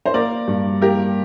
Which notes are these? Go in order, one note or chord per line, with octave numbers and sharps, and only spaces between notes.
C5
A#3 A#4 D5
G2
A#3 G4 A#4